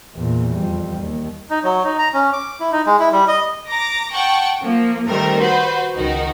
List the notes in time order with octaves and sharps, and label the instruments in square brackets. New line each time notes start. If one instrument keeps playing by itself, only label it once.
[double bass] E2 A#2
F2 G3
D#2
[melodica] D#4
F#3
D#4
A#5
C#4
D6
E4
D#4
G#3
E4
G3
D#5
[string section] A#5 D6 A#6
F#5 G5 A5 C#6 G6
F3 A#3
D#3 G3 A3 C4 A#4
F#4 B4 C5
C#2 D#3 D#4 F#4